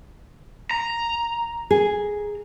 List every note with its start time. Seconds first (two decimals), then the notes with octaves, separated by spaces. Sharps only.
0.71 A#5
1.71 G#4